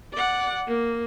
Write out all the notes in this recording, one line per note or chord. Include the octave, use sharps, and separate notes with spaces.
D5 F#5
A#3